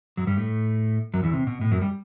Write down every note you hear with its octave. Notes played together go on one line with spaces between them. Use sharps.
F#2 F#3
G2 G3
A2 A3
F#2 F#3
E2 E3
C3
B2
A2
F#2 F#3
G3